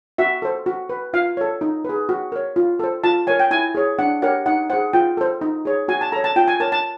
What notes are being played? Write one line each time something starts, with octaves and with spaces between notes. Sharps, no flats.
F#4 E5
A4 C5
F#4
B4
F4 F5
A4 C#5
D#4
G#4 B4
F#4
A#4 C#5
F4
A4 C5
F4 A5
A#4 C#5 G#5
G5
E4 G#5
G#4 C#5
D4 F#5
G4 A#4 C#5 F#5
D#4 F#5
G#4 C5 F#5
F4 G5
A4 C5
D#4
G#4 C#5
F#4 G#5
A5
A4 C#5 A#5
A5
F4 G5
G#5
A#4 C#5 A5
A5